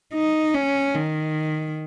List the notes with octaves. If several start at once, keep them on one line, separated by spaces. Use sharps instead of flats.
D#4
C#4
D#3